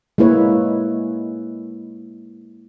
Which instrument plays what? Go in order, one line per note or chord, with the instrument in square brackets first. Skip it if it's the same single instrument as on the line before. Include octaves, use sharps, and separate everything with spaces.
[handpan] G#3 A#3 E4 B4 C#5